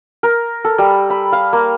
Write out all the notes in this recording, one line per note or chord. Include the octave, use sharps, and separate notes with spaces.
A#4
A4
G3
B5
F5
A#3